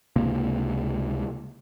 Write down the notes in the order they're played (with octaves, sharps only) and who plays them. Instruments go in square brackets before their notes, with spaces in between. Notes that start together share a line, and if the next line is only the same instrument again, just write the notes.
[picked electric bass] C#2 C3 A#3